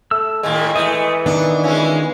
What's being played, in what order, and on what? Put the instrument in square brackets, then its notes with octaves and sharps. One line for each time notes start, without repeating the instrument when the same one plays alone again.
[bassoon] A3 [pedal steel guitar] E6
[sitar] A2 D#3 A#3 [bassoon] G#3
[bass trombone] E3 [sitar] A3 [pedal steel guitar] D#5
[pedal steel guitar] D#3 B3 [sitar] D4
[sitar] G#3 C#4 [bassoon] F4